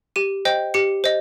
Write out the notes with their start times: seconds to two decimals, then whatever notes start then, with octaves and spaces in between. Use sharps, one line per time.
0.16 G4 D#7
0.45 C5 D#5 G5
0.74 G4 C#7
1.04 C5 D#5